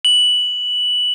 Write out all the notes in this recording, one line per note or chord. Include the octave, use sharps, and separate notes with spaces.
F#7